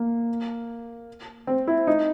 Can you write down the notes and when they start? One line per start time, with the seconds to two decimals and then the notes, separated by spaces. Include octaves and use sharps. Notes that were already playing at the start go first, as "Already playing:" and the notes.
Already playing: A#3
1.47 C4
1.68 E4
1.87 D#4